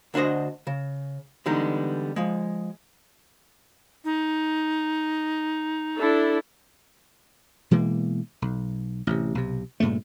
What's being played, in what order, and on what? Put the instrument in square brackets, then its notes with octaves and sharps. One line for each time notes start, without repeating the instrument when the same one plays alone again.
[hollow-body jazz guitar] D2 D4 F#4 C5 D#5
C#3
D3 E3 G3 G#3 B3 D#4
F3 G#3
[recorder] D#4
[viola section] D4 E4 A4
[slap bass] B2 E3 G#3 A#3
B1
A1 C3
B1 C3
G2 A#2 C#3 A3